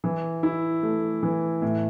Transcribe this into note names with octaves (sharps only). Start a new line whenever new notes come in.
E3
E4
A3
E3
A2